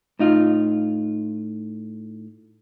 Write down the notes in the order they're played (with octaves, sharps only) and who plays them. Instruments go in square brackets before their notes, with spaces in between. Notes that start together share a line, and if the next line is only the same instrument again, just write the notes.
[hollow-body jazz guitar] A2 D#4 F4